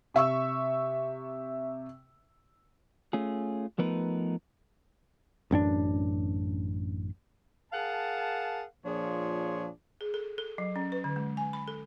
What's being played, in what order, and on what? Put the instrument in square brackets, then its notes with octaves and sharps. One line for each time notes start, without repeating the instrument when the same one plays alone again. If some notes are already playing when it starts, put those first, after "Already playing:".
[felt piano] C3 E5 C#6 E6
[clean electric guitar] A3 C#4 F4 G#4
F3 A3 B3 D#4 A#4 B4
[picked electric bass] A1 F#2 C#4 D4
[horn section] G#4 A#4 F5 F#5 A5
A#2 F3 D4 G#4 C#5 C6
[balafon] G#4
A4
A4
F#3
C#4
B4
D3
G#3
G#5
B5
A4